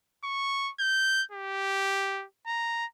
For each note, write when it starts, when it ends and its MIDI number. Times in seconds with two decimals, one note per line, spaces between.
0.24 0.71 85
0.80 1.23 91
1.32 2.25 67
2.47 2.85 82